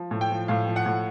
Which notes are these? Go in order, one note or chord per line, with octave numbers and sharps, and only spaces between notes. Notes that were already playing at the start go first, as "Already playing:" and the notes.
Already playing: F3
A2
G5
F3
A2 F5
F3
F#5
A2